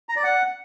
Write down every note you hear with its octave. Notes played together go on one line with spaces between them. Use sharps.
A#5
D5
F#5